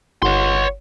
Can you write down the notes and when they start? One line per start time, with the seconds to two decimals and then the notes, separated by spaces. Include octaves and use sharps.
0.23 G1 C#5 F#5 C6